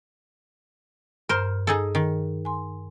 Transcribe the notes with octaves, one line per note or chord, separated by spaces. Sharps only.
G2 A#4 C5 F6
D#4 G#4 A4
D#3
G#5 C6